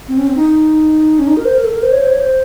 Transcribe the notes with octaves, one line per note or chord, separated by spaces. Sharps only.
C4
C#4
C4
D#4
C#4
D#4
A#4
C5
A#4
A4
A#4
C5
C#5
C5
C#5
C5